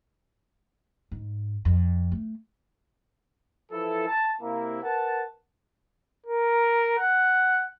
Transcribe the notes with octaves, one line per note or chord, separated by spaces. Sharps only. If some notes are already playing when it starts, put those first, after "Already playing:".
G#2
F2
A3
E3 F3 E4 A4
A5
C3 A#3 E4
A#4 B4 F#5 A5
A#4
F#5